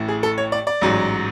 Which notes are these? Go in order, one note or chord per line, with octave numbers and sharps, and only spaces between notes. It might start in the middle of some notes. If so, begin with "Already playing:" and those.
Already playing: A1 A2 E3
G#4
A4
C#5
D5
D5
A1 G#2 F#3